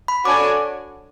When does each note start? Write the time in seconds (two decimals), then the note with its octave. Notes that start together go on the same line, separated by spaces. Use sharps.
0.08 B5
0.25 D4 F#4 A4 C#5 G#5 D6